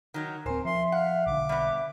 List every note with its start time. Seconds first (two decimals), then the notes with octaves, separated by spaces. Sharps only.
0.14 D#3 F#3 D#4
0.46 D1 C4 A#4 C5 G#5
0.65 F3 E5 C6
0.92 F5 F#5
1.27 B1 D3 D6
1.49 G3 B3 E5